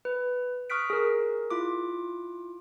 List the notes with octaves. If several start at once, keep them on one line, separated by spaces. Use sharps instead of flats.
B4
C#6 D#6 F6 F#6 B6 D7
G#4 A#4
E4 F4 D6